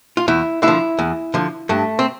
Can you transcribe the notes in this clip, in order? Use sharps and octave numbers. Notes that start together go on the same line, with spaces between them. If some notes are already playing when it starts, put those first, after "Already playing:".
F4
E2 E4
D3 F3 E4
E2
D3 F3
G2 A3
C4